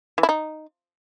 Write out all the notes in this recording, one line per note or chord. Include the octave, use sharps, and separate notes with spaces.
E3
E4
D#4